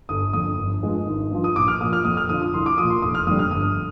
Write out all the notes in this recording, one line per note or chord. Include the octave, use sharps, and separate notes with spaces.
G1 D#6
F2 D3 D#6
G1
G2 F3 G#3
G#1
G2 F3
D#6
A#1 D6
F6
A#2 F3 D#6
F6
F2 D#6
F6
D3 F3 D#6
D#6
C2 C6
D6
A#2 F3 D#6
C6
F1 D#6
F6
F2 D3 G3 D#6
F6
G1 D#6